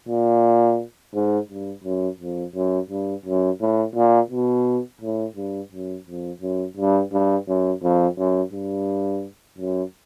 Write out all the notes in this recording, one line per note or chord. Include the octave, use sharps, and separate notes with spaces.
A#2
G#2
G2
F#2
F2
F#2
G2
F#2
A2
A#2
B2
A2
G2
F#2
F2
F#2
G2
G2
F#2
F2
F#2
G2
F#2